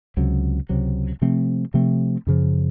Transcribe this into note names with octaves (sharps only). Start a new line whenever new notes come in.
C#2 C3 F#3
C#2 C3 F#3
C3 F3 A3 C4
C3 F3 A3 C4
F#2 C#3 F3